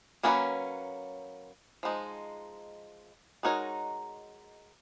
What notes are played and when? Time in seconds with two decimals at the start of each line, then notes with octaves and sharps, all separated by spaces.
0.23 F#3 A#3 C#4 F#4 B4
1.83 F3 G#3 D#4
3.43 G#3 D#4 F#4 A#4 C#5